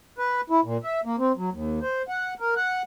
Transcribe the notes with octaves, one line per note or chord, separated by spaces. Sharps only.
B4
E4
A#2
E5
A#3
C4
F#3
D#2
C5
F#5
A#4
F#5